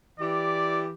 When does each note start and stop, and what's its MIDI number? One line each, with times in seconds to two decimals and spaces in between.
0.20 0.93 52
0.20 0.93 67
0.20 0.84 74